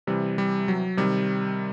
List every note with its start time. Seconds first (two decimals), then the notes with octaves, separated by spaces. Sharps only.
0.07 C3 E3 G3
0.38 G3
0.68 F#3
0.97 C3 D#3 G3